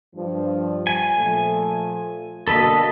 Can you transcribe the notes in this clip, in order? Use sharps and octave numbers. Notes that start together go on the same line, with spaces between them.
G2 F3
G#5
A#2 F3 A3
B2 D3 A#3 A4 B4 D#5